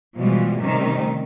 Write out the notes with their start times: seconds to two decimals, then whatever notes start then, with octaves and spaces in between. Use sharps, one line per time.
0.17 B2 E3 F3 G3 G#3
0.60 C3 D#3 G3 A3 C#4